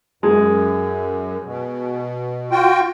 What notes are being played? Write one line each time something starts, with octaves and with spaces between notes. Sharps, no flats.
F#2 G#3
B2
F4 F#4 G5